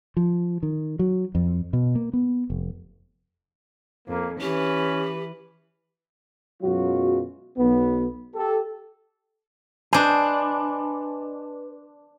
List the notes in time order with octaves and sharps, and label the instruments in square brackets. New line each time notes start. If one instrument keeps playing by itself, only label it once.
[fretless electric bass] F3
D#3
F#3
F2
B2
A#3
B3
F1
[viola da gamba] F2 [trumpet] A#3
[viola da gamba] E3 B4 [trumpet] C#4 [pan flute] G4
[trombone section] F#2 B2 F#3 G#3 F4 F#4
B1 B3
G4 A4
[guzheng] D4 C5 [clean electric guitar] B4 D#5 G#5